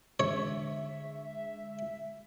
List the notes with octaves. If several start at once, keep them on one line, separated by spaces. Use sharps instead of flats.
D3 G#3 C#5 E5